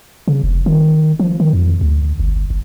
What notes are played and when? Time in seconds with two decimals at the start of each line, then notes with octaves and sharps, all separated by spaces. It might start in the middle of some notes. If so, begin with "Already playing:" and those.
0.28 C#3
0.44 F1
0.66 D#3
1.20 F3
1.40 D#3
1.53 F2
1.81 D2
2.20 G1
2.50 G1